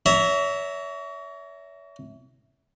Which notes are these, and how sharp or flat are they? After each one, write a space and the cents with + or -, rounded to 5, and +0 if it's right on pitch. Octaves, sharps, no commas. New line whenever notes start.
C#5 +35 E5 -10 A#5 +0